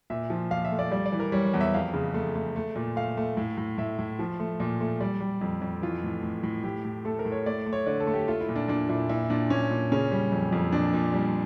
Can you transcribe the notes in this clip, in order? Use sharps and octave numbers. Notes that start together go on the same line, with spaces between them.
A#2 E5
F3
A#2 F5
E5
A3
D5
G3 D5
D5
E3
A#4
G3 C#5
C#5
E2
E5
F2 F5
C#3
A3
A3
A3
A#2
A3 F5
A3
A2
A2
A2 E5
A2
F3
A3
A#2
A3
G3 D5
G3
F2
F2
E3 F4
A2
A2
A2
A2 G4
A2
A3 A4
A#4
A2
C#5
A3 D5
A3
C#5
D3 D5
A4
A3
G4
A3 F4
E4
A#2
D4
A#2 D4
A#2 E4
A#2 E4
A#2 D4
A#2 C#4
A#2
C#3 C#4
G3
F2
F2
A#2 D4
A#2
G3